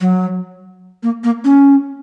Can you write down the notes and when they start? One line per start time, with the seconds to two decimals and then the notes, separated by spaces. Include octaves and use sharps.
0.01 F#3
1.03 A#3
1.24 A#3
1.44 C#4